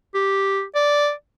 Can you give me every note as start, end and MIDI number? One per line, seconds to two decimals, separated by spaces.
0.14 0.62 67
0.75 1.11 74